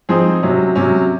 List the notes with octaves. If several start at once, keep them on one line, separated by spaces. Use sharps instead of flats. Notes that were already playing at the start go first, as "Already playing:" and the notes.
F3 C4 D#4 G#4 C5
C3 F#3 C#4
C3 F#3 C#4